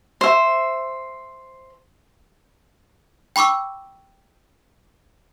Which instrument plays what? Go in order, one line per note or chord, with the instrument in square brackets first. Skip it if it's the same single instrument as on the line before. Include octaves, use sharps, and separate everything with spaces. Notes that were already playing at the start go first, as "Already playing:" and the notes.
[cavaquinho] C5 E5
[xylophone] G5 B5 C#6 D6 E6